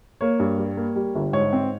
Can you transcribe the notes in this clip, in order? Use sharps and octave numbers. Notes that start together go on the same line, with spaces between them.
A#3 C#5
G2
G3
A#3
G3
G1
G#2 C#5
C4